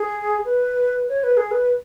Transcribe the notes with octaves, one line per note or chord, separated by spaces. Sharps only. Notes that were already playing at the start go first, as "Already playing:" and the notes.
Already playing: G#4
B4
C#5
B4
G#4
B4